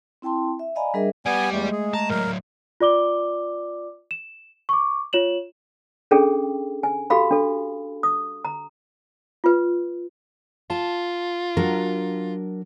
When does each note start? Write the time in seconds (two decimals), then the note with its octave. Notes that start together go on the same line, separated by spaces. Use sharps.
0.22 C4 E4 G5 A5 C6
0.59 E5
0.75 D5 D#5 F5 G#5 A#5 B5
0.94 G3 D4 G#4 A#4 D#5 E5
1.26 G3 B3 D5 G#5
1.52 E2 G#3 A3
1.72 G#4
1.94 A5 A#5
2.10 A2 F#3 A#4
2.80 F4 D5 D6 G7
4.11 E7
4.69 C#6 D6
5.13 F4 C#5 E7 F#7
6.11 C#4 D4 G#4 A4 G5
6.83 G#5
7.10 F#4 G4 A4 F5 B5
7.31 D4 A4
8.03 D#6
8.45 A#5
9.44 F4 B4
10.70 F4 A5
11.57 F#3 D4 A#4